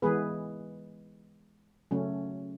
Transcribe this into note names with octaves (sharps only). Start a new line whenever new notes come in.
E3 G#3 B3 G#4 B4
C#3 F#3 A3 C#4